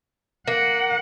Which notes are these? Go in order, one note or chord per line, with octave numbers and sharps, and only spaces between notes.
A#3 F#5